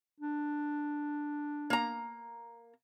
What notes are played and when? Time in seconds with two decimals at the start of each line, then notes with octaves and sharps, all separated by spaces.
0.20 D4
1.70 A#3 A#5